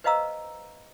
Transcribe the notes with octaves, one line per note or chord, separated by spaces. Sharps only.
B4 C5 D#5 F5 A#5 E6